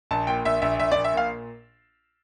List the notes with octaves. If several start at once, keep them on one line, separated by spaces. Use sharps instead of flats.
A#1 A5
A#2 G5
A#1 E5
A#1 E5
A#1 E5
D5
A#1
E5
A#2 F5